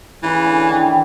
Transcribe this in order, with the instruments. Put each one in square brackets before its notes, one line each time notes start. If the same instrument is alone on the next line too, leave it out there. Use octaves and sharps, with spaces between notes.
[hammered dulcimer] C#3 [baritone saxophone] E3
[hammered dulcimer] D3
D#3
E3